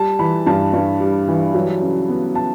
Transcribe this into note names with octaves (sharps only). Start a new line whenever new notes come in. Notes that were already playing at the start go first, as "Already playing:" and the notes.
Already playing: G3 A5
E3 B5
G2 A5
G2
G3
E3
F#3
C#3
B3
A5